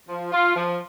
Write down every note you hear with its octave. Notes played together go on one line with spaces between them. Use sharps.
F3
F4
F3